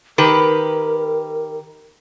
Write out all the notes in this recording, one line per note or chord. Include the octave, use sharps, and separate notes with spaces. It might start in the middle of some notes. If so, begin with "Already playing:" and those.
D#3 G4 A#4 B4